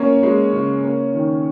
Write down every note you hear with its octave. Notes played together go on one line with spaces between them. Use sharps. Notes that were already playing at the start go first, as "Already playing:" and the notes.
Already playing: A#3 C#4 C#5
G#3
C#3
A#3
D#3